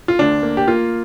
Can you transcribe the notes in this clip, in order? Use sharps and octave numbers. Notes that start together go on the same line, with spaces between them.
F4
D2 D4
A#3
G4
A#3 F4